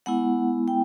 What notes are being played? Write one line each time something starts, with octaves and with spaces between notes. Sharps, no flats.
G#3 B3 E4 F#5
G5